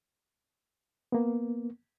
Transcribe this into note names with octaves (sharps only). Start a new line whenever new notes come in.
A#3 B3